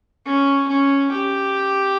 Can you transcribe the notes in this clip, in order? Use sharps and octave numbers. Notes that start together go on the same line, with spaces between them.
C#4
C#4
G4